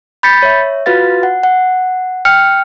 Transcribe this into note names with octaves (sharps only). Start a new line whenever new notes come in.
B5 G6 A6 B6 C#7
C#5 E5
F4 F#4 B4 F5 A6
F#5
F#5
G5 F6 C#7